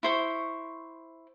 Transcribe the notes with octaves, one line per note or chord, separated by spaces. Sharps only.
E4 C5 C#6